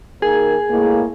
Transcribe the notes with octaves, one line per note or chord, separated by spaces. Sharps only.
D#3 A#3 G#4 A#4
A2 G#3 A#3